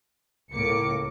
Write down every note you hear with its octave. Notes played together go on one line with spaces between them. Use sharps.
C#2 A2 A#3 D6 C#7